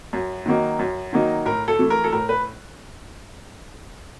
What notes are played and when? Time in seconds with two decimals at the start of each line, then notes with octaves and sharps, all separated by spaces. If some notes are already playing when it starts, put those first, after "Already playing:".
0.13 F#2
0.46 D#3 F#3 A#3 D#4
0.79 F#2
1.13 D#3 F#3 A#3 D#4
1.45 A2 A#4
1.68 A4
1.79 E3 A3
1.90 A#4
2.04 A4
2.13 A2 A#4
2.29 B4